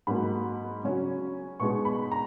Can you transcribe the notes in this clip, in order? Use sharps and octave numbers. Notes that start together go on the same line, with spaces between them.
G#2 F#3 A#3 B5
C#3 F#3 C#4
B2 G#3 B3 D#4 C#6
B5
A#5